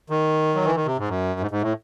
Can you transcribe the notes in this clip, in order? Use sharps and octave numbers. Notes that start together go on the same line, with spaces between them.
D#3
F#3
E3
D#3
C3
G#2
F#2
G#2
G#2
A2